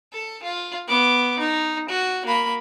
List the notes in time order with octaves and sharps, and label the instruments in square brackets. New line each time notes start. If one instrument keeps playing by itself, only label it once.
[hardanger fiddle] A4
F4
B3 D6
D#4
F#4
A#3 B5